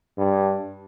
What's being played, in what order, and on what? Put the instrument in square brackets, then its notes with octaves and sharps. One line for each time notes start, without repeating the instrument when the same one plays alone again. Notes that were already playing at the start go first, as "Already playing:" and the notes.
[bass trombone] G2